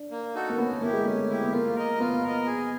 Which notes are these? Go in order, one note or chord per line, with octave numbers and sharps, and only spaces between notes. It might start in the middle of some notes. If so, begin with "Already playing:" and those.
Already playing: D4
A#3
D#4 F#4 A4
A#3
B3 C#4
B3
A#3 E4 G4
G#3
A3 C#4
E4 G4
B3
A#3 F4
A#4 D#5
B3 F4
A#4 D#5
G#4